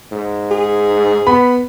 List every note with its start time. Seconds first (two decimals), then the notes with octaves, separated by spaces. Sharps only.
0.12 G#2
0.51 G#4
1.27 B3 B5